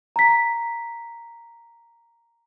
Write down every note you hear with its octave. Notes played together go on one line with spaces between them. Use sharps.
A#5 B6